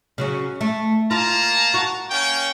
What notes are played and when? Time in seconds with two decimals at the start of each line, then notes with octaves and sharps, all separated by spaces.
0.18 C#3 F#3 C#4
0.61 A3
1.11 A#3 F4 A5 A#5
1.74 F#4
2.11 A#3 C#4 G5